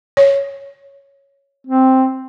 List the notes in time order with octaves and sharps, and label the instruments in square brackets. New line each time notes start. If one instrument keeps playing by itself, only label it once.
[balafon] C#5
[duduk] C4